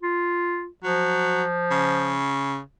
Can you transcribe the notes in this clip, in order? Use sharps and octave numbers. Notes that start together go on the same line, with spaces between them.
F4
F3 F#3
C#3